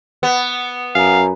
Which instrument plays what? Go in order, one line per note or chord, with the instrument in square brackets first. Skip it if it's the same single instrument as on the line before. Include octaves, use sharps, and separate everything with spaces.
[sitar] B3
[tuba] F#2 [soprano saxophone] F5 [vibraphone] G#5 A#5